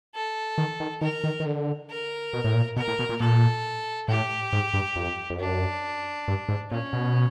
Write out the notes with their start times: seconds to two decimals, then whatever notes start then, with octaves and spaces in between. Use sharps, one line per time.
0.15 A4
0.58 D#3
0.80 D#3
1.01 D#3 A#4
1.24 D#3
1.40 D#3
1.46 D3
1.90 A#4
2.33 B2
2.44 A2
2.55 A#2
2.76 B2 A#4
2.88 A2
2.99 B2
3.09 A#2
3.20 A#2 A4
4.08 A2 G4
4.53 G#2
4.74 G2
4.96 F2
5.30 F2
5.39 F#2 D4
6.28 G2
6.49 G#2
6.71 A#2 C#4
6.93 B2